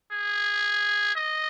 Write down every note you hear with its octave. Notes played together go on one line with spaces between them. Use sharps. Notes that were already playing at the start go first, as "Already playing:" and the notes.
G#4
D#5